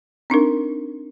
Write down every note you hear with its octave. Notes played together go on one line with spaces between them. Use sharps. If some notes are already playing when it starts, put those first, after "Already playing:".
C4 D4 D#4 A#4